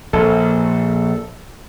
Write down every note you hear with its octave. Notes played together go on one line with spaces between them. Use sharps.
A#1 A4